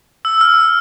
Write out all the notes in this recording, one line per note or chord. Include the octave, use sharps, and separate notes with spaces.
E6
F6